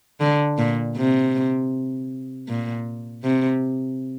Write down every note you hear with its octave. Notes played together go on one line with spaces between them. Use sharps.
D3
A#2
C3
A#2
C3